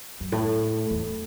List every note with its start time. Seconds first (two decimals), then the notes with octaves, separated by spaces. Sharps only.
0.20 F#2
0.32 A2
0.91 E2